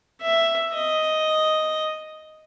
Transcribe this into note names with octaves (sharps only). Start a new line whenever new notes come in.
E5
D#5